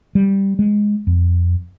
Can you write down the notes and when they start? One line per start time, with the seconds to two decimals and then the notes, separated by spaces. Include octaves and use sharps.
0.15 G3
0.59 G#3
1.07 F2